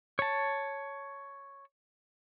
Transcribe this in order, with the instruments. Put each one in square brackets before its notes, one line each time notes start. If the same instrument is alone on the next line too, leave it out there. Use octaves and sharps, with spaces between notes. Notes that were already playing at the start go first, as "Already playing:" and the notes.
[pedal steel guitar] C#5 A5